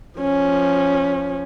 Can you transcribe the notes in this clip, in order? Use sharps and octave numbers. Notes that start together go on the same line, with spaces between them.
F3 C#4